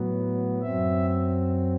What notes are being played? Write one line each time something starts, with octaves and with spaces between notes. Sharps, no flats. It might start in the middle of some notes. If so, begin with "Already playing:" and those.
Already playing: A2 F#3 B3
F#2 F#3 C4 E5